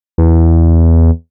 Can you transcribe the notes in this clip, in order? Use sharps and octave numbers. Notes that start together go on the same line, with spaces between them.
E2